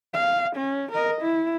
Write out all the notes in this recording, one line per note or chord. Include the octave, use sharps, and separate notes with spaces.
F5
C#4
A#4 D#5
E4